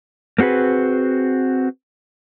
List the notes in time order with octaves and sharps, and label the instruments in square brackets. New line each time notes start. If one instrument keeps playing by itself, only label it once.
[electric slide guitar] A#3 C4 F#4 G#4 B4